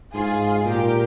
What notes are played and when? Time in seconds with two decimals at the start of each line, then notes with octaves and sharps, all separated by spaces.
0.14 G#2 F4 G#4
0.66 A#2 G4 A#4